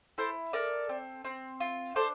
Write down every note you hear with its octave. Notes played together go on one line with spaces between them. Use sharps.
E4 A4 C5
A4 A#4 D5
C4
C4
F4
D4 A4 C5